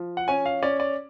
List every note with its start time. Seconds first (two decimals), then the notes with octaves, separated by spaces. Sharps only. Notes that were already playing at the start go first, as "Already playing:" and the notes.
Already playing: F3
0.17 F#5
0.28 C#4 G#5
0.46 F5
0.63 C#4 D5
0.80 D5